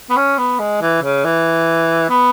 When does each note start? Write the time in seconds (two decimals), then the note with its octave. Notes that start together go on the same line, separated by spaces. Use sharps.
0.10 B3
0.16 C#4
0.38 B3
0.60 G#3
0.81 E3
1.02 C#3
1.25 E3
2.10 B3